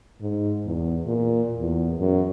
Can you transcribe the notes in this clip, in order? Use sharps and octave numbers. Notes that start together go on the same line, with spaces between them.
G#2
E2
A#2
E2
F#2